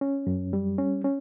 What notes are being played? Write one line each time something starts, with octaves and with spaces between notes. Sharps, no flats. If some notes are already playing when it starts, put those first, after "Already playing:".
C#4
F#2
G3
C#4
C#4